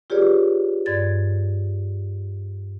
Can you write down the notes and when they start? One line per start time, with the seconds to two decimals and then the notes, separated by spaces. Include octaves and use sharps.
0.10 F4 G4 G#4 B4 C#5 D5
0.86 G2 D5 G#6 A6